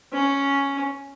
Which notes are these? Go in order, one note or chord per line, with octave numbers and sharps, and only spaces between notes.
C#4